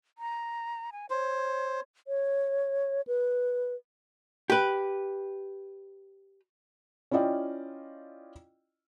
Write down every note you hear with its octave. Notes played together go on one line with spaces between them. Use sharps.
A#5
G#5
C5 C#5
C#5
B4
G4 B4
C#4 E4 F4 D5 D#5 G5